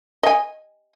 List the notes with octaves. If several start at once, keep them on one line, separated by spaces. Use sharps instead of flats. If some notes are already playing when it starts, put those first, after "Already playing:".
D#5 G#5